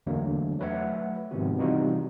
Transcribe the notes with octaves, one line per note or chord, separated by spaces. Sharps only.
E2 D3 F#3 A3 A#3 D4
F#3 A3 B4 C#5 E5 F#5
G#2 C3 D#3 F3 B3 F#4
C3 E3 G3 D#4 F4 F#4